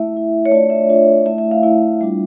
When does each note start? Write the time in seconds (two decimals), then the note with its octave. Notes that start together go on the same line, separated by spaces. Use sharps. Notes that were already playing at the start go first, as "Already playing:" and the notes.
Already playing: A3 E4 E5
0.14 A3 E4
0.45 C#5
0.51 A3 D4 F4 D5
0.70 E5
0.89 A3 D4 F4
1.26 A3 E4 E5
1.38 E5
1.51 F5
1.63 A3 E4
2.01 G3 D4 F4